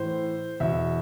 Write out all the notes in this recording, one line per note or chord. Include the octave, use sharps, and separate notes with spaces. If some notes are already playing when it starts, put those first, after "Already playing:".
Already playing: A2 E3 C5
E2 B2 E5